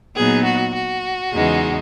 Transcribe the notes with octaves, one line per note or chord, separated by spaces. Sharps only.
A#2 F#3 B3 D#4 G#4
F#4
F#4
E2 C#3 E3 G#3 D#4